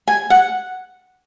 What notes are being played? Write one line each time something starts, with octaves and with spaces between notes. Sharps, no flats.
G#5
F#5